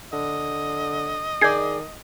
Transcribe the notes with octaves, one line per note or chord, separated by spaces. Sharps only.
D3 D#5
D#3 G#4 D5 G6 G#6 C7